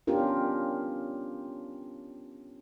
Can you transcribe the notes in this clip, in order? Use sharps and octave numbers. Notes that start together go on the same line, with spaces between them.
B3 C#4 D4 F4 G4 A#4